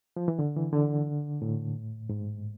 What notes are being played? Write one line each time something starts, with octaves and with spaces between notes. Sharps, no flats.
F3
E3
D3
E3
D3
A2
G#2